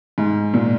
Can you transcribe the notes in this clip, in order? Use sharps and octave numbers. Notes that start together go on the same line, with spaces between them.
G#2
A#2